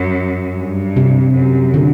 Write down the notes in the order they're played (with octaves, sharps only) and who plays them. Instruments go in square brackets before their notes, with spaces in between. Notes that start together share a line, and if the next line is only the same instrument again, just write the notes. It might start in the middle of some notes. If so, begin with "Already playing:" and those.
Already playing: [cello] F#2
G2
[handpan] C3
[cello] F#2
[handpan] D3